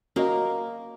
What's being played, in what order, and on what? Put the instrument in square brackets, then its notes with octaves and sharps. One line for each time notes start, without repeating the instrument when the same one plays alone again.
[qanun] A#3 [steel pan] C#4 F#4 A#4 D#5